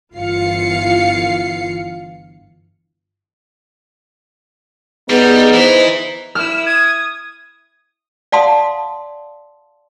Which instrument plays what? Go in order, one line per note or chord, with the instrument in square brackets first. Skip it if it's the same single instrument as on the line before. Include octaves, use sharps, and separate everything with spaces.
[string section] G1 E3 F4 F5 C7 C#7
[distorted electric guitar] G3 [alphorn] B3 [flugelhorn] D#4 [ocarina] G#4
[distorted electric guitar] E3 E4 [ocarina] C5
[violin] E4 E6 [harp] F6
[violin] D#6 [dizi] G#6
[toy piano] D5 F5 F#5 A5 C6 D#6